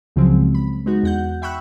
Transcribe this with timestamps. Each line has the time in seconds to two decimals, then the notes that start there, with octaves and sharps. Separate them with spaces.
0.16 C#2 C#3 F3 F#3 G#3 C4
0.55 B5
0.86 G#3 B3 D#4 F#4
1.03 E2 F#5 G6
1.42 E5 G5 B5 C#6 E6 F#6